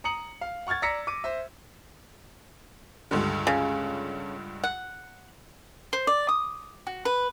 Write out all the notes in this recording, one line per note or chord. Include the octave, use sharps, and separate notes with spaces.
A#5 D#6 C#7 F#7
F5
F#5 C#6 F6 G#6 A6
D5 A#5 E6 A#6 B6 C#7
D6 D#7
C5 E5
C#2 G2 D3
C#3
F#5
C5
D5
D#6
F#4
B4